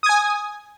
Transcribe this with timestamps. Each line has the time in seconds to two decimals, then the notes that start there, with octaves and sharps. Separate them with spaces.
0.03 D#6
0.06 G#6
0.09 G#5